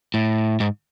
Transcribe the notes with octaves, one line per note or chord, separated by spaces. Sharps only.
A2
G#2